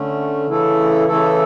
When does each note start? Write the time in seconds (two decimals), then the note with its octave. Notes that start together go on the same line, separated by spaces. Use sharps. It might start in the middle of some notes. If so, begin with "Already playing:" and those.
Already playing: D3 A3 C#4
0.47 C#3 E3 A3 E4 A4
1.08 C#3 E3 A3 E4 A4